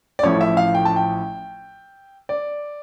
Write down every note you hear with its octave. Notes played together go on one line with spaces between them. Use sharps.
D5
A1 A2 F3 C#4 E4 C#5
E5
F5
G5
A5
G5
D5